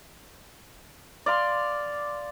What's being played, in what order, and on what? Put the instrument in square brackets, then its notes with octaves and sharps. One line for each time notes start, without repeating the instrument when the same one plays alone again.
[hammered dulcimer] D5 F5 C6